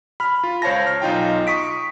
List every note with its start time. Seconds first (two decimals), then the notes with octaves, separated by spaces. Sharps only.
0.20 B5 F6
0.44 F4
0.62 C#2 C5 C#5 F5 A5 A#6
0.87 F6
1.02 B1 D#4 F4 G5
1.47 C#6 D#6 B6 D7